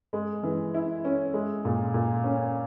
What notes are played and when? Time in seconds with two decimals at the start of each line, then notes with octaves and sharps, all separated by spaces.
0.13 G#3
0.43 E3
0.74 E4
1.05 C#4
1.34 G#3
1.65 A#2
1.94 A#2
2.24 C#4